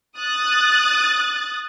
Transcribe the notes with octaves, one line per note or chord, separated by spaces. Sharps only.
D#6 F#6 A6